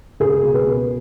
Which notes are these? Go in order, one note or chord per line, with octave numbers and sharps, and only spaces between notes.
C#2 G#4
B2
B4
B2